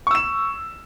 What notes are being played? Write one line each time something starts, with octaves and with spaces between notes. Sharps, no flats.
C#6 E6 E7